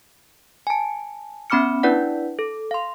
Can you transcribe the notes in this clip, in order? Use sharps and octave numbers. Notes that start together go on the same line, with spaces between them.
G#5 A5
B3 C#4 B5 D6 F6 C#7
D4 E4 B4 D5 F#5
A4
F5 C6